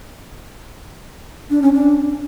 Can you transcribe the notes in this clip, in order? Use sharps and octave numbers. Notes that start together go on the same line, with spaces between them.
D4
C#4
D4